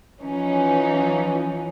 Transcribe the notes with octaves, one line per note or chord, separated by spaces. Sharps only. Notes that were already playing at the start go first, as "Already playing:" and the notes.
E3 F3 C#4 D#4